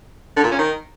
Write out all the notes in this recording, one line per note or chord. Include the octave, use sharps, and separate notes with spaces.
D3
A#2
C#4
D#3